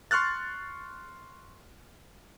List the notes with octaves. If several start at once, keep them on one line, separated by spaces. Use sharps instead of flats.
C6 C#6 F6 F#6 A6